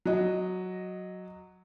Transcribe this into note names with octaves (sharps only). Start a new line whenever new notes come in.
F#3 D#5